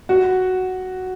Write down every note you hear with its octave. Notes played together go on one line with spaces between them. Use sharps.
F#4